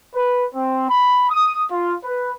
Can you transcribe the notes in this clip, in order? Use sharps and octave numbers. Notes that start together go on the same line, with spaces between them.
B4
C4
B5
D#6
F4
B4